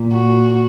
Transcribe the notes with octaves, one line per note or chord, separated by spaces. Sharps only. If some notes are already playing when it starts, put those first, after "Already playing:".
Already playing: A#2
F#4